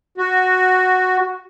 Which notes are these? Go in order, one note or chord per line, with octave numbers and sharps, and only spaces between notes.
F#4